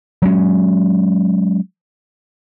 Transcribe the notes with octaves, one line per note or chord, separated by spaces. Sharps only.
F#3 G#3 C#4